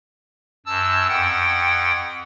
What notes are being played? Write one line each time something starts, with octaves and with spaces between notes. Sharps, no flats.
F#2 A5 E6
F2 F#5 G5